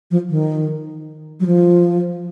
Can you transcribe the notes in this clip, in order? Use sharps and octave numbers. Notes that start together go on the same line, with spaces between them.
F3
D#3
F#3
F3